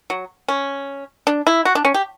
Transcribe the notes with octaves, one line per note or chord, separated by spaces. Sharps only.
F#3
C#4
D4
E4
F#4
D4
C#4
G4